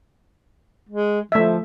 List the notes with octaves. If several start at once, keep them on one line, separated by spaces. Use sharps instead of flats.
G#3
F3 A3 E5